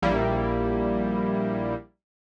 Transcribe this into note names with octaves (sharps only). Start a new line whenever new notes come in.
A#1 G3 A#3 E4